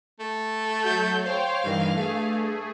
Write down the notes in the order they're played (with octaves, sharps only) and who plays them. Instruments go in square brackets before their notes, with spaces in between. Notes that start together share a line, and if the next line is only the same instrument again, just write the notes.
[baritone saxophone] A3
[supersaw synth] F#3 [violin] G6
[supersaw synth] C5 C#5 G5 [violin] F5
[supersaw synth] G2 E3 [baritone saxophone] D#3
[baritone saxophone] G2 [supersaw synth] A3 G#4